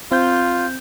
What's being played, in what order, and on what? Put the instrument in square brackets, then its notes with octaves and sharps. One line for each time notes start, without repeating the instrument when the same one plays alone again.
[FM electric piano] C4 G6 [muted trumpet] F4